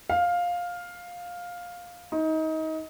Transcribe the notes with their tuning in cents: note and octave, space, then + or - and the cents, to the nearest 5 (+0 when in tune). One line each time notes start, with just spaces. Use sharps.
F5 +10
D#4 +25